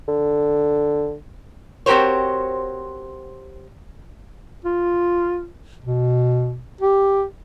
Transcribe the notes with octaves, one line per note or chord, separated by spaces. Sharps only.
D3
C4 F#4 G4 A#4 C5 C#5
F4
B2
G4